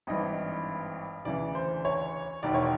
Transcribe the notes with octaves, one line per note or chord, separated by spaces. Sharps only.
G#1 G2 E3 D#5
D2 C#3 E3 D5
C5
C#5
E1 D#2 D#3 D5
C#5